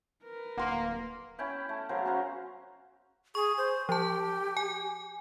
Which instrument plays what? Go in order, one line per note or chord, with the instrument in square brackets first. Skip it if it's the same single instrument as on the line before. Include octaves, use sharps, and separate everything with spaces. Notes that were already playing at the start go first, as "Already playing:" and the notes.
[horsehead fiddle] A#4 B4
[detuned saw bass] D1 [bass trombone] A#3 [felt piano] F#5 C6
[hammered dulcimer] C#4 E4 G5 B5
A3
C#3 F#3 A#4 C5
C#4 F#4 A#4 C5
[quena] G#4 [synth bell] C#6
[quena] C5
[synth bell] F3 A5 [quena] G4
[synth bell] G#5